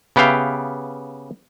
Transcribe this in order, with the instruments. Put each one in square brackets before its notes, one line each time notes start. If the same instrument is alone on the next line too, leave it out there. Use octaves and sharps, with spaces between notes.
[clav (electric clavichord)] C#3 B3 G4 E5 F5 G5